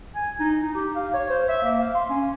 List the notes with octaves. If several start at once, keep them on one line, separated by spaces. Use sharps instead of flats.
G#5
D#4
D#4
G4
F5
C#5
C5
E5
A#3
F5
C6
C#4